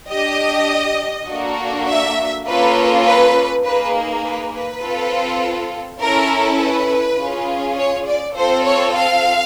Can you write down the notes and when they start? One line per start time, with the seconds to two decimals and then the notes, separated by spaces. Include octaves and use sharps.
0.11 D4 G4 D#5
1.29 A#3 D4 F#4 A4
1.88 E5
2.47 A#3 C#4 F4 A4 B4
3.06 B4
3.64 A#3 D#4 G#4 B4
4.24 B4
4.53 B4
4.82 C4 F4 A4
6.00 C#4 E4 A4 A#4
6.60 B4
7.18 C#4 F4 G#4
7.77 C#5
8.07 D5
8.35 C4 F4 A4 C5
8.65 C#5
8.95 F5